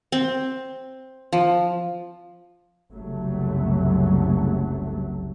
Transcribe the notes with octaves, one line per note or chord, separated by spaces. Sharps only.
C4
F3
F#1 C2 F#3 A3